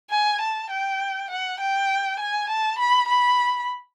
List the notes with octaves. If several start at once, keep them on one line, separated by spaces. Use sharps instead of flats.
G#5
A5
G5
F#5
G5
G#5
A5
B5
B5